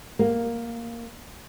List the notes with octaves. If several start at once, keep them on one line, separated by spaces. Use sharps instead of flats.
A#3